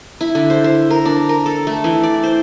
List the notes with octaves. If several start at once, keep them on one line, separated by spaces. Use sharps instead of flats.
E4
D3
C5
C5
A#4
D4
A#4
A4
A3
E3
D5
C5